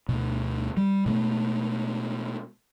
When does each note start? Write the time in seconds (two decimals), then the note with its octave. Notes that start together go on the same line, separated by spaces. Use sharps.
0.09 D2 B2
0.77 G3
1.06 B2 G#3 A3